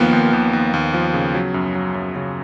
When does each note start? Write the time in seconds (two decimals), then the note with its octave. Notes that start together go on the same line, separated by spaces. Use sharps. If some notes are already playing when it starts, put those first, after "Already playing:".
Already playing: D#2 F3 A#3 B3
0.13 D#2
0.33 D#2
0.53 D#2
0.74 D#2
0.94 F3
1.14 C#3
1.34 F#3
1.54 F#2
1.75 F#3
1.95 F#2
2.16 C#3